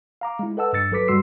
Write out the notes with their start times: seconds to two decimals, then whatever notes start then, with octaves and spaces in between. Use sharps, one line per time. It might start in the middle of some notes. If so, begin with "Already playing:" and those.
0.21 F5 A#5 D6
0.39 G#3 E4
0.57 A4 B4 D#5 F#5 A5 E6
0.73 G2 E6 A6 C#7
0.91 G1 F#3 A4 B4 D6 B6
1.08 G2 G3 F#4 C6 E6 C7